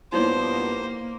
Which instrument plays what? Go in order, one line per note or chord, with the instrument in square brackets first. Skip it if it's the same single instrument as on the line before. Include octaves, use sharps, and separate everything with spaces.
[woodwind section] G2 F3 B3 [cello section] A#3 [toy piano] D#4 E4 C#5 [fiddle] C5